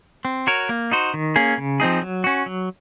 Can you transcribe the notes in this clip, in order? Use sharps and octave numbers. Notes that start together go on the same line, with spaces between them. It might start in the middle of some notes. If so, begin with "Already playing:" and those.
C4
F#4 A#4 C#5
A#3
D#4 F#4 C5
D#3
A#3 C#4 G#4
C#3
F3 C4 D#4 G#4
F#3
C#4 F#4
F#3